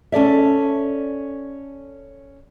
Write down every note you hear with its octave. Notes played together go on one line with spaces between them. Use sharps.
C#4 A4 D5 E5